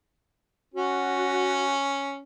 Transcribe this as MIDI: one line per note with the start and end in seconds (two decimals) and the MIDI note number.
0.74 2.22 61
0.74 1.74 66